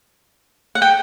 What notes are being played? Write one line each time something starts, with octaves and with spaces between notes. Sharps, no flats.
F#5
G5